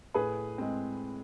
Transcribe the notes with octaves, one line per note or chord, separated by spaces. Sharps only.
A2 G#4 B4
G#3 C4